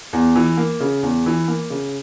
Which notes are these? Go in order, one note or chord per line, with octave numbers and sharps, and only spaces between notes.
E2
E3
A#3
C#3
E2
E3
A#3
C#3